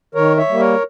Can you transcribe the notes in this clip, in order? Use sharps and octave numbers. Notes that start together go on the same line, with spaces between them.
D#3 A#4 C#5
C#5 E5
G3 A#3
A#4 C#5